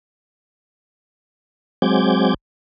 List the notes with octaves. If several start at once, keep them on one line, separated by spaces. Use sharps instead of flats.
F#3 G#3 C4 D6 G6 G#6